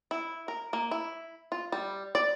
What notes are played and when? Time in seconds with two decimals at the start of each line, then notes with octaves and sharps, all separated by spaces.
0.11 E4
0.48 A#4
0.73 A#3
0.91 E4
1.52 F4
1.72 G3
2.15 D5